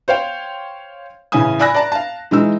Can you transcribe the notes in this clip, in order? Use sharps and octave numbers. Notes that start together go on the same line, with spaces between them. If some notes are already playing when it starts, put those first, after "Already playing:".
C5 C#5 F5 G5
A2 C#3 E3 C#4 G#5 D#6
D5 G#5 B5 E6 F#6 A#6
D5 A5 A#5
F5 A5
E3 G#3 D#4 E6